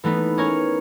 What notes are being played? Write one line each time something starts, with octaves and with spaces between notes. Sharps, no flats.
E3 A3 B3 D#4
C#4 A#4 C#5